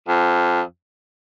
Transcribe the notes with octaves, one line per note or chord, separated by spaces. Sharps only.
F2